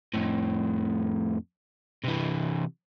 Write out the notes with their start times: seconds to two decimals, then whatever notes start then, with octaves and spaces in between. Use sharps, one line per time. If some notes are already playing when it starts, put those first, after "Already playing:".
0.14 F2 A2
2.05 C3 E3